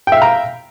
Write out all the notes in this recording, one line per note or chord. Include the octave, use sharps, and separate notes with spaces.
E5 F5 G5 A#5